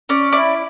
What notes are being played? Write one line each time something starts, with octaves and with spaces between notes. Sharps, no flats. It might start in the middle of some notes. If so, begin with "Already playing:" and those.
C#4 D5
E4 D5